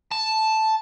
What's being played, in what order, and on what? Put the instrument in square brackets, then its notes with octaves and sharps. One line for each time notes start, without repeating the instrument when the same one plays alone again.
[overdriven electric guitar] A5